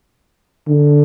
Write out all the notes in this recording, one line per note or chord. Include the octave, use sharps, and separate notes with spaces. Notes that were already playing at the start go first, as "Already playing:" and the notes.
D3